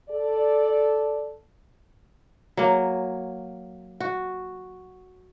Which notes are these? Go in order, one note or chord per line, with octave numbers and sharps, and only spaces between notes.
A4 D5
F#3 A#3
F#4